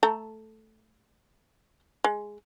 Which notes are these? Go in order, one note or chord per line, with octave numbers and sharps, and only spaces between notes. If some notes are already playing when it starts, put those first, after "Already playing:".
A3 A4 A#5
G#3